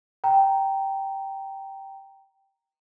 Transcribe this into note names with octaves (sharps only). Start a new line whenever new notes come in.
G5 A#5